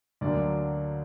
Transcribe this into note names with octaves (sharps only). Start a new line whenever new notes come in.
D2 D3 F#3 A#3 D5